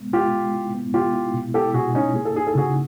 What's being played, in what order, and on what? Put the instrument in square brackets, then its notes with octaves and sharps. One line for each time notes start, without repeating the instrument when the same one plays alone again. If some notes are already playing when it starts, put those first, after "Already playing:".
Already playing: [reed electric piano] G#3 B3
[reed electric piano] G#3 [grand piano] F4 G4
[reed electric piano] G#3
E4
B3
[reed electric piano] B3 [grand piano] F4 G4
[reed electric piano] E4
B2
[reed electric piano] E4 [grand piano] G4 A4
[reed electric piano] B2 [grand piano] F#4 G#4
[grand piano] C#4 D#4 [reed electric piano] E4
[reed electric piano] A#3 [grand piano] G#4
[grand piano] A4
[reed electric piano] D#4 [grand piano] G#4
[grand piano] A4
[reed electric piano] C#3 [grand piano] F#4 G#4